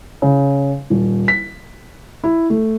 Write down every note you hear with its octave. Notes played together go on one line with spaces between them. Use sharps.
C#3
D#1
B6
E4
A3